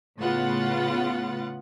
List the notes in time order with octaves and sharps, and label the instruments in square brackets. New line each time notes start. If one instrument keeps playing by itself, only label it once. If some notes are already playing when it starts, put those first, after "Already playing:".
[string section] A2 C#3 B3 F4 F#5 A6